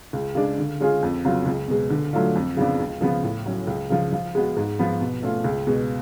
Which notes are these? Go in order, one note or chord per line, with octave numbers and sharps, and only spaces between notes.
C#2
C#3 G#3 D4
D3
G#3 C#4 F4 G#4
F2
C#3 F#3 B3 F4
C#2
B2 G#3
D3
F#3 A3 D4 F4
F2
C#3 F3 B3 D4
C#2
C#3 F3 B3
A2
F#3 C#4
C#2
C#3 F3
F3
G#3 B3 F#4
G#2
F3 B3
B2
A3 C#4 F4
C#2
B2 G#3